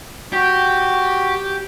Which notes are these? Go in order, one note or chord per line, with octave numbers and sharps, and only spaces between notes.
F#4 G4